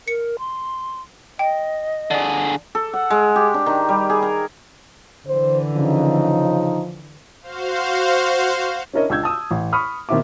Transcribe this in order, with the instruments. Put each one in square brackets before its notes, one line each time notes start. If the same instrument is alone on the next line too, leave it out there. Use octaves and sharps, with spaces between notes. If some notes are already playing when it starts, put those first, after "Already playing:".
[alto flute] A#4 [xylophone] C#7
[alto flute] C6
[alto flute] D#5 [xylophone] G5
[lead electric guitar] D3 G#4 [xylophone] D5
[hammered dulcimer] A4
F#5
G#3
G4
D4
D#3
G3
G#4
A#4
[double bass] D3 E3 [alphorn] C5
[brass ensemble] C#3 D#4 [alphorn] F3
[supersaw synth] F#4 C5 F5
[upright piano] C#4 D4 E4 A#4 C#5 D#5
C#2 D4 E6 G6 G#6
A5 D#6 E6
A1
B5 C#6 D#6 F6
B2 D#3 C4 E4 E5 D6